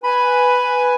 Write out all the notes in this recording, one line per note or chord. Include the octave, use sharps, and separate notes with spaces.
B4 G#5 B5